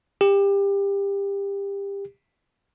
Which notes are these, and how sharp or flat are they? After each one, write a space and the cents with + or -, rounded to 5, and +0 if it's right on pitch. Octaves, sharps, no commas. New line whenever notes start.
G4 +25